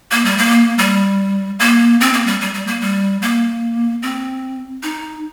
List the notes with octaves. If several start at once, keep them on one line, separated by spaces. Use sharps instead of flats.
A#3
G3
A#3
G3
A#3
C4
A#3
G3
G3
G3
A#3
G3
A#3
C4
D#4